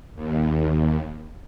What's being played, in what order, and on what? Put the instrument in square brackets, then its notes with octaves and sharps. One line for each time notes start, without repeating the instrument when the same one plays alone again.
[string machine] D#2